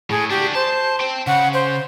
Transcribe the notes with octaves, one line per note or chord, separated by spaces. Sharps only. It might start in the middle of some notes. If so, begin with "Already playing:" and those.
A2 G#4
D4 F#4 G4
C5 A5
G5 C6
C#3 F#5
C5